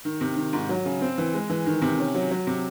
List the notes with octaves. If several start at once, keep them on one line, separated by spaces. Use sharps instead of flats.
D#3
C3
D#3
G#2
F#3
C#3
C4
E3
G#3
E3
D#3
C3
C#4
F#3
F#3
C3